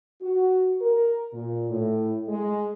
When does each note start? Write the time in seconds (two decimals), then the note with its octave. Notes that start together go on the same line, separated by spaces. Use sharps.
0.21 F#4
0.81 A#4
1.33 A#2
1.69 A2
2.28 G#3